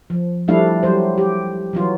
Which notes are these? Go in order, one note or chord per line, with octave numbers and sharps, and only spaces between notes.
F3
F3 G3 A3 D4 E4 F5
F#3 G3 C5
G4
E3 F#3 F4